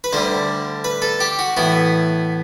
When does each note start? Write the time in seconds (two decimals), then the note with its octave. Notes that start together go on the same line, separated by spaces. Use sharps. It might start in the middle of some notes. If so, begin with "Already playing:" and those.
0.04 B4
0.13 D2 D3 G3 C5
0.84 B4
1.02 A4
1.20 G4
1.39 F#4
1.57 A2 E3 B3 F#4